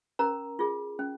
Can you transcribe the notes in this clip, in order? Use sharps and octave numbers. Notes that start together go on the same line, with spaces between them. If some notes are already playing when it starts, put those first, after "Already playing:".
C#4 A#4 A#5
F4 G#4
C#4